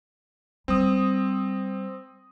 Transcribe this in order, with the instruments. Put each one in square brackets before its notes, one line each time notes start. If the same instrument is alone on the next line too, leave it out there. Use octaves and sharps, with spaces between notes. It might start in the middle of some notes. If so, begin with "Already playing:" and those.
[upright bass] G3 [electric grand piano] C4 D#6